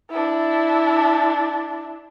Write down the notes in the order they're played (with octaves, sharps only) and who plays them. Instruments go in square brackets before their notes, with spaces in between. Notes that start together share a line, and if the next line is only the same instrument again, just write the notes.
[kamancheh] D4 E4